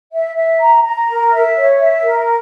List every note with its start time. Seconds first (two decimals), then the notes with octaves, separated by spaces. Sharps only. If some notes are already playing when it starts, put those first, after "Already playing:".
0.13 E5
0.36 E5
0.60 A#5
0.84 A#5
1.09 A#4
1.32 E5
1.56 C#5
1.79 E5
2.04 A#4